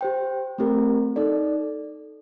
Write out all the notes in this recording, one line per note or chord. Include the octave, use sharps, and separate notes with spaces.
G4 C5 G5
A3 C4 G4 A#4
D#4 A4 D5